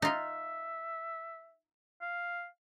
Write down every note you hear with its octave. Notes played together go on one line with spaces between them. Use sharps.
D#4 F4 E5
F5